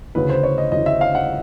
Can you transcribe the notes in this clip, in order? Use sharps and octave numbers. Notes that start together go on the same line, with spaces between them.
D2 C#3 E3 B4
C5
C#5
D#5
D2 C#3 E3 D#5
E5
F5
F#5